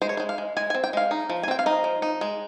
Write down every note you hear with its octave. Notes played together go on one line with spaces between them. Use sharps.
G#3 C5
C#5
G#3 C5
F5
G#3
G#3 G#5
G#5
C4
G5
G#3 F5
D#4
F3
G#5
C4 G5
F5
D#4 D#5
F3
D#4
G#3